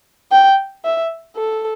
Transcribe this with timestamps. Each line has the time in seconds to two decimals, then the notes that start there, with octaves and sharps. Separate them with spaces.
0.32 G5
0.85 E5
1.36 A4